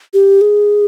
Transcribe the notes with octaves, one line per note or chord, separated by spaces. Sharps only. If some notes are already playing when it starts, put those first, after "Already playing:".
G4
G#4